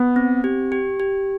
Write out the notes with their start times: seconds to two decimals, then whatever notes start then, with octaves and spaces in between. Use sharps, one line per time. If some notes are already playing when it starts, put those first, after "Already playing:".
Already playing: B3
0.16 C4
0.44 G4
0.72 G4
1.00 G4